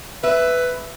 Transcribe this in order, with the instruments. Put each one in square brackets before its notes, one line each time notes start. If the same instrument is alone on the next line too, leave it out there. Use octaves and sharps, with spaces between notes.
[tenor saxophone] B4 [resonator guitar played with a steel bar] E5